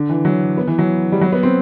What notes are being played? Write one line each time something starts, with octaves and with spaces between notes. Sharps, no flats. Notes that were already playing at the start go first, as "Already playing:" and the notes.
Already playing: D3
E3
F#3
B3
E3
F#3
G3
F#3
B3
C4